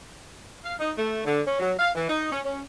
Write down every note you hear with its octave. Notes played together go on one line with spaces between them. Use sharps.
F5
D#4
A3
D3
C#4
F#3
F5
E3
D#4
C#4
C#4